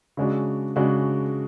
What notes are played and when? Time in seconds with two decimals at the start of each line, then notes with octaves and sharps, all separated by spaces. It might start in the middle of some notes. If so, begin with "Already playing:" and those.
0.17 C#3 G#3 D4 F#4
0.76 C#3 G#3 D4 F#4